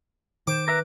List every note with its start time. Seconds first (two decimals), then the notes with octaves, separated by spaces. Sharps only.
0.47 D#3 C5 D6
0.68 A#4 B4 E5 A#5